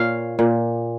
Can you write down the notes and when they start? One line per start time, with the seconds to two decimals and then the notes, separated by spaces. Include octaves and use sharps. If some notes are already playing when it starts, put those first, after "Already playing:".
Already playing: A#2 C#5 F5
0.39 A#2